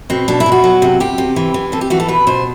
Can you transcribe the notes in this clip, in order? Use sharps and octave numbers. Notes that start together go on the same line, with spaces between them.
B2 C4
B2 D4
E4
B2
F#4
F#3
C3
C3 G4
C3
E3
E3
C3 A4
G4
E3 F#4
A4
B2 B4
B2 C5